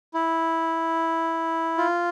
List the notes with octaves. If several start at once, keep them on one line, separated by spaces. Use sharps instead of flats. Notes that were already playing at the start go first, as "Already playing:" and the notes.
E4
F4